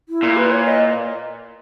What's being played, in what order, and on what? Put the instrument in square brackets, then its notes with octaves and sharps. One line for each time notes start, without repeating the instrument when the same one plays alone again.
[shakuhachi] E4
[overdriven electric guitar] A#2
[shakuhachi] B4
C#5
D#5